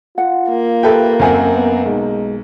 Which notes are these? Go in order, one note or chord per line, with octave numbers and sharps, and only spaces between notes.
F4 F#5
A#3
G4 A4 B4 E5 G5
F#2 C4 C5 E5 F#5 G#5
B3
B1 G#3